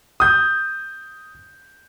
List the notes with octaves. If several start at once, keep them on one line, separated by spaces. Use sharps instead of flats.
D#6 G6